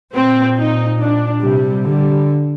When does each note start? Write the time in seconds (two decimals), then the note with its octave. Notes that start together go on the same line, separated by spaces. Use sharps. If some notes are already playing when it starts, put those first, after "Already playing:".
0.15 A#2 C4
0.57 D#4
1.00 D4
1.42 C3 G3
1.85 D3 G3